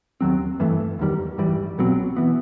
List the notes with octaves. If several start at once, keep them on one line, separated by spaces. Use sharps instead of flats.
D#2 D#3 F#3 C4
G2 E3 A3
E2 D#3 G3
A1 G2 E3 G3
B1 B2 F#3 C4
E3 B3